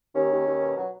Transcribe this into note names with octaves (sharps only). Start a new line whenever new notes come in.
D#2 C#4
D#2
D#2
B2
F#3